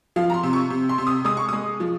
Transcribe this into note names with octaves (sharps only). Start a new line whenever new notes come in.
F3 F5
A#5
C6
C3
C#6
C3
C6
C3
D#6
G#3 D#6
C#6
G#3 D#6
F3